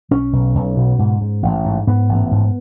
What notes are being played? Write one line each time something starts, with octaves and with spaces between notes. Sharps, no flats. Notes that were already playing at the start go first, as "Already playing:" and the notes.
B1 C#4
B1
B1
B2
G#2
G#2
A1
G#2
G#2 B3
A1
G#2